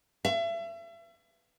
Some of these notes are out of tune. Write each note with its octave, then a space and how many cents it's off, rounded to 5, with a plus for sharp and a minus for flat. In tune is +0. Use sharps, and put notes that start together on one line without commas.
E5 +35